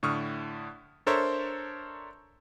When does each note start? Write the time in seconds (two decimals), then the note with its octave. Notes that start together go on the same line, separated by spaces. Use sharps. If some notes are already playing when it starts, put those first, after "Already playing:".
0.03 A2 D3 C#6 D#6 F6
1.06 D4 A4 A#4 C5 C#5 E5